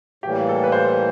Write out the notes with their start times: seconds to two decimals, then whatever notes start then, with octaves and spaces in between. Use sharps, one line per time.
0.23 A2 E3 G3 A#3 G4
0.49 A4
0.64 B4
0.72 C5